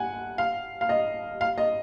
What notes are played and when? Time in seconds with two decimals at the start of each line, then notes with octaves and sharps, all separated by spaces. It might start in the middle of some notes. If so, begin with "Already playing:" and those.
Already playing: F#5 G#5
0.38 F5
0.81 F5
0.89 D#5
1.41 F5
1.58 D#5